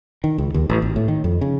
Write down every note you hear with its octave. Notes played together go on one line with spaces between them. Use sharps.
D#3
C#2
D#2
A1
G#1
A2
D#3
F2
C#3